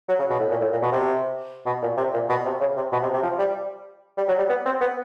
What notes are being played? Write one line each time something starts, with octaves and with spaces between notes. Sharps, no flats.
F#3
C#3
B2
A2
A#2
A2
A#2
B2
C3
B2
A#2
C3
A#2
B2
C3
C#3
C3
B2
C3
C3
F3
G3
G3
F#3
G3
B3
C4
B3